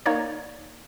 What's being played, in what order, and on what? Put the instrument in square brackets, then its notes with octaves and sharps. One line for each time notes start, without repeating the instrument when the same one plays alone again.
[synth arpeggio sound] A#3 D#4 C#5 D5